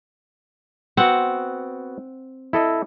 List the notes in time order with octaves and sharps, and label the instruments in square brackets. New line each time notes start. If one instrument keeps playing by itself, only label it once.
[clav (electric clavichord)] B3 F#4 [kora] C4 F#5
[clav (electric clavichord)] E4 A4 D#5